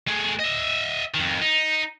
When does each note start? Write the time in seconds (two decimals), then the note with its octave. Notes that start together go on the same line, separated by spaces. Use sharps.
0.07 A3 G#4
0.39 D#5 E5
1.15 F2 D#3
1.41 D#4